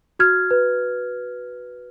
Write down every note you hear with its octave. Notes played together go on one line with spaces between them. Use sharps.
F#4 F6 G#6
B4